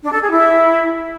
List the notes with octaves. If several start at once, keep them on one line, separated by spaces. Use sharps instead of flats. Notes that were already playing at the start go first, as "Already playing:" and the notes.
D4
A4
G#4
E4